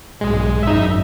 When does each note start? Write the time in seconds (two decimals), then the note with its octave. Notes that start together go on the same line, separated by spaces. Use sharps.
0.21 B1 G#2 G#3
0.63 G#1 F#2 D#4 E5